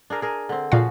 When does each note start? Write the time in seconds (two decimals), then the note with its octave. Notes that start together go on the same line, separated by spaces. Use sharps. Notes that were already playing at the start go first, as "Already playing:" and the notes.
0.10 D4 G#4 A#4
0.22 G#4 A#4
0.49 D3 C4
0.72 A#2 C#3 F3 F#4 F5